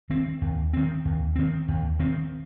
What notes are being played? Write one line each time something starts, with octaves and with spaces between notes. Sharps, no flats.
D#3 C4
D#2
D#3 C4
D#2
D#3 C4
D#2
D#3 C4